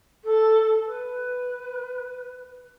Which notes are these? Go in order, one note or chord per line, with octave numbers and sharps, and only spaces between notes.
A4
B4